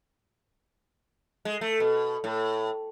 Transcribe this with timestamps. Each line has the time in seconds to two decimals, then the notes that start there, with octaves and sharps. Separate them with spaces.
1.45 G#3
1.61 A3
1.80 B2
2.24 A2